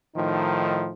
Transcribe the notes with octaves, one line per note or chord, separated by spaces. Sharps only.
A2 D#3 F3 D#4